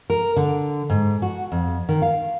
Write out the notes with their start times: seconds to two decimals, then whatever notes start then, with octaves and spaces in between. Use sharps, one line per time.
0.10 A#4
0.36 D3
0.90 G#2
1.22 F#4
1.52 F2
1.89 D#3
2.02 F5